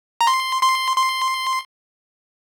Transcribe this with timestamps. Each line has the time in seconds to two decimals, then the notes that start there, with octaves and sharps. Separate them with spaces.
0.21 A#5
0.27 C6
0.63 C6
0.97 C6